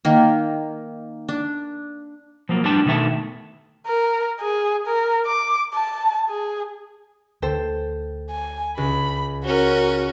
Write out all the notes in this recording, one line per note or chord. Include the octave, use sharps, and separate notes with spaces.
D#3 A#3
D4
F3 F#3 A#3
A2 G3 B3 D4 A5
B2 D#3 A3 E5 A5
A#4
G#4
A#4
D6
A5
G#4
D2 A4 C5 G5
G#5
C#2 B5
C#4 F#4 A#4